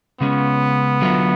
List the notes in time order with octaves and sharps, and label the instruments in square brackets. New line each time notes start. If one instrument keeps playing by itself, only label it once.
[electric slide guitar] C#3 G#3 C#4 [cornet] B3
[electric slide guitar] D3 F#3 A3 F4